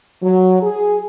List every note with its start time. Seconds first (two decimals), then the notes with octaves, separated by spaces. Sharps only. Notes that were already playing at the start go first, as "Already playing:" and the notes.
0.23 F#3
0.63 G#4